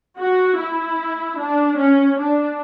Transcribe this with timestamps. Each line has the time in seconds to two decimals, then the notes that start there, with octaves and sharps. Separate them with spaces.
0.20 F#4
0.59 E4
1.39 D4
1.78 C#4
2.18 D4